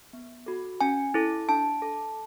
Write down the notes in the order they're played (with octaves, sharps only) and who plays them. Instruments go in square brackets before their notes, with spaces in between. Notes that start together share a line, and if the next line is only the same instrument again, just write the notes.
[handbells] B3
F#4 A4
C#4 G#5
E4 A4
D4 A5
A4